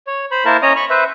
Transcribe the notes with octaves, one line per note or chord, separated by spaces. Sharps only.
C#5
C5 B5
A#3 E4 A#4 C5 A5
C#4 C#5 D#5 A#5 D#6
B5 C#6
B4 C5 E5